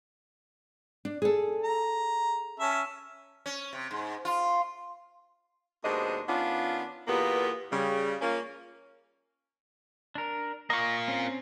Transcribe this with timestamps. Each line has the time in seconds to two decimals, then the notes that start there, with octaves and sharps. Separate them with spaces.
1.05 D4
1.22 G#4 A4
1.62 A#5
2.60 C#4 E5 A5
3.46 C#4
3.73 C3
3.91 G#2
4.25 F4
5.84 D#2 B2 G#3 D4 C5 D#5
6.28 D#3 B3 C#4 D4 F4
7.07 E2 A#2 A#3 B3 G4 B4
7.71 C#3 G3
8.21 A#3 C#4 F4
10.15 D4 A#4
10.70 A#3 F4 D#5 C#6
11.08 C4 C#4